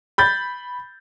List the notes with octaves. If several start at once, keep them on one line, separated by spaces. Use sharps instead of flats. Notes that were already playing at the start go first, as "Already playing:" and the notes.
B5 G6 A6